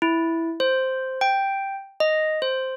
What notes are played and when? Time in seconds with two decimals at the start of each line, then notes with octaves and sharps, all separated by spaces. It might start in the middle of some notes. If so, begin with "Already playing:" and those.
0.02 E4
0.60 C5
1.21 G5
2.00 D#5
2.42 C5